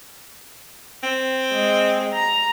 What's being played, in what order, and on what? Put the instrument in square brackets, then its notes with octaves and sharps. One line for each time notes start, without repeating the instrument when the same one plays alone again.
[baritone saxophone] C4
[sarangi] G#3
A#5